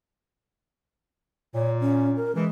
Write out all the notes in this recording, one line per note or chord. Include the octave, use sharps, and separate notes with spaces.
A#2 C#5
C#4
A#4
E3 G#3